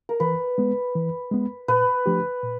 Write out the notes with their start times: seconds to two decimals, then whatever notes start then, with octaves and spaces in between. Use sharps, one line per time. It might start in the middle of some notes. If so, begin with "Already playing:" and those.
0.09 A#4
0.20 E3 B4
0.58 G#3 B3
0.95 E3
1.31 G#3 B3
1.68 A#2 B4
2.06 F3 A3 D4 G4
2.44 A#2